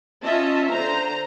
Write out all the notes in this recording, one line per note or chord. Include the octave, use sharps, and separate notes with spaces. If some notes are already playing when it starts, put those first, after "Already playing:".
C#4 F4 D#5 E5 A5
D3 C5 A#5